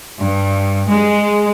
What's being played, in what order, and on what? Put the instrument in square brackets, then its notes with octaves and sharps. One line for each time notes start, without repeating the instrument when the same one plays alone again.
[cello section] G2
G#3